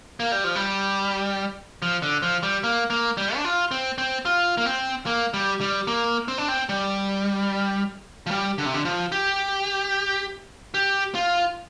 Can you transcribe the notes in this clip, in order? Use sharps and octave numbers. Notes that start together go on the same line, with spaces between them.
A#3
G3
F3
G3
F3
D3
F3
G3
A#3
A#3
G3
D4
F4
C4
C4
F4
A#3
C4
A#3
G3
G3
A#3
C4
D4
C4
G3
F3
G3
D3
C3
D3
F3
G4
G4
F4